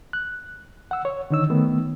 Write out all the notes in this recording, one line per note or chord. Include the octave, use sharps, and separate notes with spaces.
F#6
F#5 E6
C#5
D3 D#3 D#4 C#5 E6
D#3 A3 B3